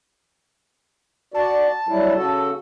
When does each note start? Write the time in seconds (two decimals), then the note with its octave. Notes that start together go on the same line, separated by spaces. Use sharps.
1.34 F#4 D5 A5
1.89 F#3 G3 E4
2.15 C#3 F#4 A4